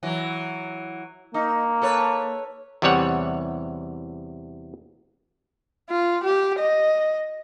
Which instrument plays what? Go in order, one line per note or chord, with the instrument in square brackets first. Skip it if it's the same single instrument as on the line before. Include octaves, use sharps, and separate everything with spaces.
[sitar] E3 F#3
[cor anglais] A#3 [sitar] D#4
[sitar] A4 B4 C#5
[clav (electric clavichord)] E2 C3 E3 G3 C#5 F#5
[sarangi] F4
G4
D#5